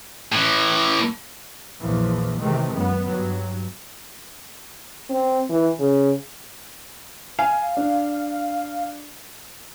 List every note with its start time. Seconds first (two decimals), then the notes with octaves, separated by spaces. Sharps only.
0.32 A2 E3
1.81 A#1 E2 A#2 E3 F3
2.39 C3 D#3 E3 G#3 A3
2.74 F#2 B3
3.07 G2 F#3
5.09 C4
5.50 E3
5.79 C#3
7.39 F5 G#5
7.77 D4